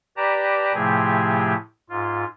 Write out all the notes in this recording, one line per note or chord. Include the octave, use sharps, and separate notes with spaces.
G4 B4 D5 A5 A#5
A2 C3 F3 A3 G4 G#4
G#2 F4